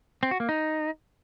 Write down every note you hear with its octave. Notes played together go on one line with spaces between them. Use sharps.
C4
F#4
A#3
D#4